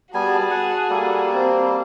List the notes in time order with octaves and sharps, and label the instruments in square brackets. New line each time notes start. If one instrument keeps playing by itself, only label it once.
[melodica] G3 B3 G#5 [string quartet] F#4 G#4 [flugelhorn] A5
[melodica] F#5
[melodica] G3 A#3 [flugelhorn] A4
[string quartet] C4 [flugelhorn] A5